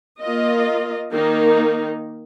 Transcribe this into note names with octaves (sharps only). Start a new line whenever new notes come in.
A#3 F4 A#4 D#5
D#3 A#3 D#4